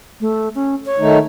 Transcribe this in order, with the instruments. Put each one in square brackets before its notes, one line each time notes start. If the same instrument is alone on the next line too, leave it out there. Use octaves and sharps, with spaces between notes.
[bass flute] A3
C#4
C#5
[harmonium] D#3 A3 D#4